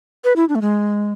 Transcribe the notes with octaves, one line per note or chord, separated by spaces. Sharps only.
B4
E4
D4
A3
G#3